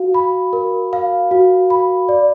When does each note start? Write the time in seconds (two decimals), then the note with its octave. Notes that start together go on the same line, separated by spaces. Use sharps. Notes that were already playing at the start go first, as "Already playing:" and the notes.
Already playing: F#4 F5
0.14 B5
0.53 A#4
0.93 F5
1.31 F#4
1.70 B5
2.09 D5